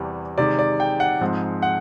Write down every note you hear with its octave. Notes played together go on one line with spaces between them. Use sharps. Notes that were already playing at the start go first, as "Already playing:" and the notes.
Already playing: E2 C3 E3 G3
C3 D#3 G#3 D5
D5
G5
F#5
G#2 F3 G#3 C4
F#5